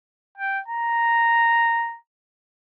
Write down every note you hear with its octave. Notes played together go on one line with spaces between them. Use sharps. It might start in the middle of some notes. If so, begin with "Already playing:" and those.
G5
A#5